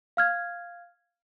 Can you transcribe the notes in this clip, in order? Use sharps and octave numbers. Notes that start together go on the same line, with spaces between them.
F5 F6 G#6